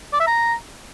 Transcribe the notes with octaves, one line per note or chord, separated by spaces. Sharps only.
D5
E5
A#5